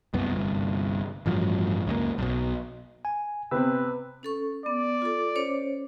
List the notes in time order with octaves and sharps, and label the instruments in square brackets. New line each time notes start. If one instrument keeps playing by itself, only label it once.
[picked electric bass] C2 F#2 B3
G1 C2
A1 G2 F3 F#3
C#2 F#2 A#3
B1 B2
[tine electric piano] G#5
[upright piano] C3 B3 C4 [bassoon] B4 [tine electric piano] E6
[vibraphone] C#4 A4 C#6
[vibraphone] B3 [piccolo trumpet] D5
[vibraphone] F4 A4
C#4 C5 C#5